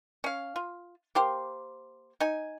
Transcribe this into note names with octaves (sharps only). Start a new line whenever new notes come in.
C#4 F5
F4
A#3 G4 C5
D#4 G#5